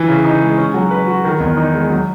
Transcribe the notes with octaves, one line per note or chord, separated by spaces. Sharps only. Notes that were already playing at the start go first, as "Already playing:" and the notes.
Already playing: E3
C#3
D#4
G#3
C#4
F#3
B4
F#4
D#3
E2
D#4
G#3
F#3